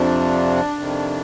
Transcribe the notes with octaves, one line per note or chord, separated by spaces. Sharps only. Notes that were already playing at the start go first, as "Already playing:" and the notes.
Already playing: F2 C3 F3 D4
F2 C3 D#3